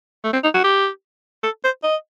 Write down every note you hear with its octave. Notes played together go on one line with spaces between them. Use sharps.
A3
C4
D#4
F#4
G4
A4
C5
D#5